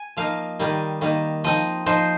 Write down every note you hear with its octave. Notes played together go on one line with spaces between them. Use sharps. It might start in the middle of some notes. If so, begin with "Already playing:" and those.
Already playing: G#5
F3 A#3 D#4 F5
D#3 G3 A#3 D#4
D#3 G3 A#3 D#4
F3 C4 D#4 D#5
F3 C4 D#4 C5